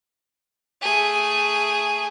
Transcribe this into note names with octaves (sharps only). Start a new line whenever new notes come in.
A3 G#4